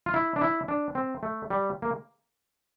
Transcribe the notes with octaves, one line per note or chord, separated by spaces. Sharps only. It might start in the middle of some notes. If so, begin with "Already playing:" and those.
F4
E4
D4
E4
D4
C4
A3
G3
A#3